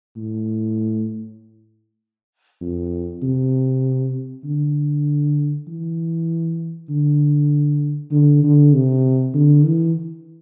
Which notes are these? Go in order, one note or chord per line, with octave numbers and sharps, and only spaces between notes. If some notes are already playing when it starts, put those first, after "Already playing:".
A2
F2
C3
D3
E3
D3
D3
D3
C3
D3
E3